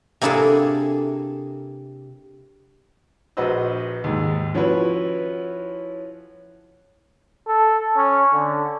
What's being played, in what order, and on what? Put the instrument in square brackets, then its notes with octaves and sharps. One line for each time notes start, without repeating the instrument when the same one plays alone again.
[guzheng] C3 A#3 D4 E4 G#4 A4
[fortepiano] A#1 F#4 B4 C5 D#5 E6
D#2 G#2
F3 C#4 E4 F#4 B4 C#5
[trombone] A4
C#4
D3